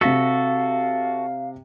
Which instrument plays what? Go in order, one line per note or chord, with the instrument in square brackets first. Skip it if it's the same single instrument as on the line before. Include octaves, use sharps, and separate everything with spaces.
[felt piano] C3 A#6 B6 [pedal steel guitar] F#4 A4 [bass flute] F5